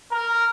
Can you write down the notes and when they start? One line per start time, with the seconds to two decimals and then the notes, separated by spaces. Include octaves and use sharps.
0.12 A#4